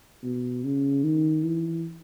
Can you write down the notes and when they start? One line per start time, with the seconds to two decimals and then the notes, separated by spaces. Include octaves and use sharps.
0.23 B2
0.64 C#3
1.04 D#3
1.45 E3